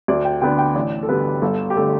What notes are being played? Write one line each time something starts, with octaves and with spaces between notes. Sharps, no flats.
D2 D5
G5
D3 B3 D4 G5
G5
A1 D5
A4
G2 D3 B3 B4
G1 A4
G4
D3 A3 A4